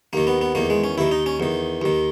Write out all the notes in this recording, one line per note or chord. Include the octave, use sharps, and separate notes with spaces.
D#2 D#3 A#3
B3
B3
E2 D#3 A#3
G#3
C#4
D#2 D#3 E4
D#4
C#4
E2 D#3
D#2 D#3